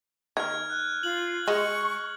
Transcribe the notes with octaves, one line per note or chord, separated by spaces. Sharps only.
D#3 F6 G#6
F#6
F4 F#7
G#3 C#6